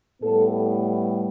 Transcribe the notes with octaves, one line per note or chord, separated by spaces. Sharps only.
A2 G3 B3 A4